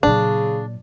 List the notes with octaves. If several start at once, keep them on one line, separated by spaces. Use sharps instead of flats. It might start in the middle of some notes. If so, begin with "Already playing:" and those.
A#2 C#3 F#3 D4